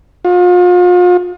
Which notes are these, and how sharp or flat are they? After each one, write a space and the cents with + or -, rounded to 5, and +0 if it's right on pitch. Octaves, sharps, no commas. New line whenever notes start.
F4 +40